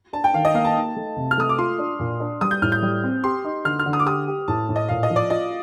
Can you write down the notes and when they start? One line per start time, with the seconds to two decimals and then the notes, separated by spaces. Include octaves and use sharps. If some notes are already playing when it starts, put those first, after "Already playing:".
0.13 D4 A5
0.24 G5
0.34 D#3 F5
0.45 D#5
0.55 A#3 F5
0.65 A5
0.76 D#4
0.97 A3
1.16 C3
1.31 F6
1.38 A3 D#6
1.49 D6
1.58 F4 C6
1.78 D4
1.99 A#2
2.20 D4
2.41 G3 D#6
2.51 G6
2.62 A2 F6
2.72 G6
2.83 G3
3.03 C4
3.24 G4 C6
3.45 D#4
3.65 D3 F6
3.79 F6
3.86 D3
3.93 D#6
3.99 D6
4.06 G4 D#6
4.28 G4
4.48 A2 A5
4.69 A2
4.76 D#5
4.89 A#2 F5
5.03 D#5
5.10 F3
5.16 D5
5.30 F4 D#5